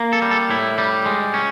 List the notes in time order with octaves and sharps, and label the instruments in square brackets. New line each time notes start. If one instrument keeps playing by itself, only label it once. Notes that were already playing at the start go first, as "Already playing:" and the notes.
Already playing: [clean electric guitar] A#3
A4
G3
A4
A2 E4
G3
G#3
C#4